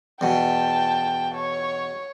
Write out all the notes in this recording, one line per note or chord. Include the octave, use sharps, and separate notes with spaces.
E2 B2 G5 A5
C#5